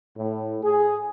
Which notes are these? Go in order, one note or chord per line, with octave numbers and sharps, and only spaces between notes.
A2
G#4